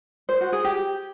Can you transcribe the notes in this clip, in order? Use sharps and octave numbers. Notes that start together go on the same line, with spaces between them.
C5
F#4
G#4
G4